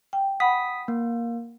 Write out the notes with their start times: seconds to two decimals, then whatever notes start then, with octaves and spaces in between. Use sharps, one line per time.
0.13 G5
0.40 F#5 B5 D#6 B6
0.88 A#3